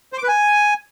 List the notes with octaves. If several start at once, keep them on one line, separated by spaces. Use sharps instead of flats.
C5
D6
B4
G#5